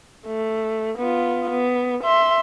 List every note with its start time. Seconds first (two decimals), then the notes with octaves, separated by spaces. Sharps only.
0.26 A3
0.98 B3 F4
1.50 B3
2.04 E5 C6